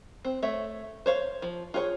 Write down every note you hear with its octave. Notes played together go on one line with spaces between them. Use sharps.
C4
A3 C#5 E5
C5 C#5 F5
F3
F4 G#4 A#4 C#5